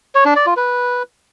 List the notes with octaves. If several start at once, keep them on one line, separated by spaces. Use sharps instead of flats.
C#5
D4
D5
F4
B4